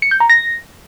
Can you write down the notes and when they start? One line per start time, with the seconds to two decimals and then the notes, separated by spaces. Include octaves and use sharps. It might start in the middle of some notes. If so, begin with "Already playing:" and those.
0.02 C#7
0.11 G6
0.20 A#5
0.30 A#6